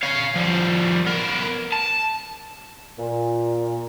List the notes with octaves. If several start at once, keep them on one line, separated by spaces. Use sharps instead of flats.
C#5 F5
F3 G3
B3 A#4
A5
A#2